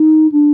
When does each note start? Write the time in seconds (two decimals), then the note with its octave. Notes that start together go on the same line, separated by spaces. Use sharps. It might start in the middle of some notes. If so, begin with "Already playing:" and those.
Already playing: D#4
0.31 D4